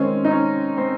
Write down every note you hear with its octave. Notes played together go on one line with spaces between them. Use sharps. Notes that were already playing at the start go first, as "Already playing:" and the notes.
Already playing: D#3 G#3 C4 C#4
D#4
C#4
C4